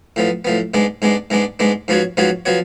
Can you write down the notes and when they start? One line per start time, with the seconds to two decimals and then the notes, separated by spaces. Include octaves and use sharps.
0.16 A2 F3 B3
0.45 A2 F3 B3
0.74 G#2 G#3 B3 D4
1.02 G#2 G#3 B3 D4
1.30 G#2 G#3 B3 D4
1.59 G#2 G#3 B3 D4
1.88 G#2 F3 B3 F#4 C#5
2.17 G#2 F3 B3 F#4 C#5
2.46 F3 B3 F#4 C#5